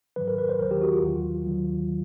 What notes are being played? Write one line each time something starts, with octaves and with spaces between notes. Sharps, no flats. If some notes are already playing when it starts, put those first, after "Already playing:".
G#2 D#3 F#3 B4
A#4
B4
C5
D#2 D#3 F#3 A#4
G4
F#4
F4
D#2 D#3 F#3
D#2 D#3 F#3